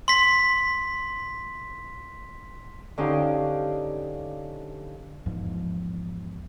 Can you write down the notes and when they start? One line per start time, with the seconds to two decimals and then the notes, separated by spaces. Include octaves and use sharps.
0.08 C6 B6
2.98 D3 C#4 D#4 G4 C5 F5
5.26 A#1 E2 G#2 F3